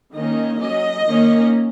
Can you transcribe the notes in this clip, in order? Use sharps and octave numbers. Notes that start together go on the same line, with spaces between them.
D#3 A#3 C#4 D#5
F#3 C#4 D#5
D#3 A#3 C#4